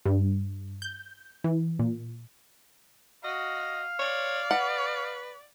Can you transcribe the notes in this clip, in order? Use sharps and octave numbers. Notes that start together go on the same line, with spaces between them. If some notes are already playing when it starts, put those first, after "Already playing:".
G2
G6
E3
A#2
F#4 D#5 F5
C#5 D5
B4 F#5